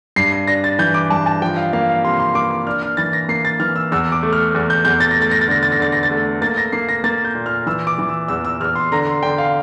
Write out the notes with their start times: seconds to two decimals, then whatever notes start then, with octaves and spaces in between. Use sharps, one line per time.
0.16 G2 C7
0.32 C7
0.47 D4 A#6
0.64 A6
0.79 E3 G6
0.94 D6
1.10 G2 A5
1.26 A5
1.42 F3 G5
1.57 F5
1.73 A#3 F5
1.89 F5
2.05 C3 C6
2.20 C6
2.35 A#3 D6
2.51 D6
2.67 D4 F6
2.82 F6
2.97 E3 A6
3.13 A#6
3.28 A#3 C7
3.45 A6
3.60 E3 F6
3.76 E6
3.92 E2 E6
4.12 D6
4.23 A3
4.33 F6
4.54 E2
4.70 G6
4.85 E2 G6
5.00 A6
5.11 A#6
5.17 A3
5.22 A6
5.31 A#6
5.41 A6
5.48 D3 A#6
5.63 A6
5.72 A#6
5.80 D3 A6
5.92 A#6
6.03 A6
6.11 A3
6.41 A#3 A6
6.57 A#6
6.72 A#3 C7
6.89 A#6
7.04 A#3 A6
7.25 G6
7.35 A#2
7.46 F6
7.66 E3 E6
7.87 D6
7.98 E3
8.09 E6
8.28 E2 E6
8.45 E6
8.60 E2 F6
8.76 C6
8.92 D3 A#5
9.07 C6
9.23 D3 G5
9.38 F5